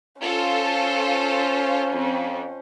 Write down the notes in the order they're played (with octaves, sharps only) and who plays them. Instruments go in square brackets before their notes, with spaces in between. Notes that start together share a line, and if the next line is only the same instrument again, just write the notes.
[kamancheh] C#4 C5 [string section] F4 A4
[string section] F2